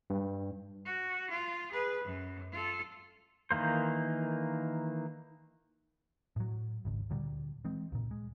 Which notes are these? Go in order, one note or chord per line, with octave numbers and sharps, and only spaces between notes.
G2
F#4
F4
G#4 B4
F#2
F4 A4
D#3 E3 A#3 C5
A2 F#3
G#1 C#2
D2 A#2 D3 G3
E3 G#3 C4
C#2 A#2
G#3